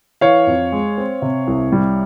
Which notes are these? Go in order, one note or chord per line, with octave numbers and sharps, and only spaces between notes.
E3 C#5 F5
F2
G#3
C4
C3
C2
G3